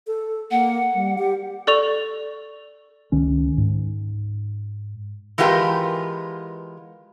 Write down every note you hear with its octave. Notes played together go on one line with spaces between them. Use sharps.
A4
A#3 F#5
G3
G4
A4 D5 C#6 F7
C#2 D#3 C#4
G#2
E3 G#3 B3 F4 G4 A#4